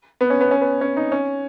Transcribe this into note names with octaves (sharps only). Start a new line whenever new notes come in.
B3
C#4
B3
C#4
B3
C#4
D#4
C#4